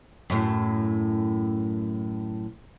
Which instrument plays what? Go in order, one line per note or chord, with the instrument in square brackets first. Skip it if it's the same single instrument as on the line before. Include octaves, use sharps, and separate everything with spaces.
[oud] F#2 A2